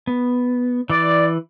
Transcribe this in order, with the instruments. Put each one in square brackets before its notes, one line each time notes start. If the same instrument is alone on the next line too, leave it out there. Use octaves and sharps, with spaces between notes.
[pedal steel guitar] B3
[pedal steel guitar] E3 D6 [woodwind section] D5